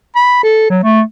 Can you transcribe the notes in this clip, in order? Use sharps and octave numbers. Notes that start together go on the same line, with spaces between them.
B5
A4
F#3
A3